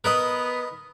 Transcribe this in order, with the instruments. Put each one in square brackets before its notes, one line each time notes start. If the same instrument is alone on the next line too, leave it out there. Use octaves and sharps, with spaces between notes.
[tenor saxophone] B3 [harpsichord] A#4 B4 D#5